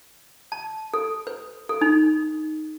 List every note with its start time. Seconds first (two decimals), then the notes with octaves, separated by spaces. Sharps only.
0.52 A5
0.94 A4
1.27 B4
1.69 A4
1.81 D#4